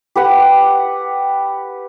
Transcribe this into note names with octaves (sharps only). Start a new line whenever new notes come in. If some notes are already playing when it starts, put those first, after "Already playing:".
G4 B4 F#5